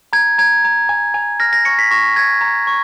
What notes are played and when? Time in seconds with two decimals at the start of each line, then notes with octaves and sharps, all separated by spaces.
0.13 A#5 G#6
0.38 A#5 G#6
0.65 A#5
0.89 G#5
1.14 G#5
1.40 F6 A#6
1.53 A#6
1.65 C#6 C#7
1.79 B6
1.91 C#6 A#6
2.16 A#5 G#6
2.41 A#5
2.67 C#6